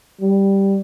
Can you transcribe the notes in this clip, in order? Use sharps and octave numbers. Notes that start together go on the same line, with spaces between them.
G3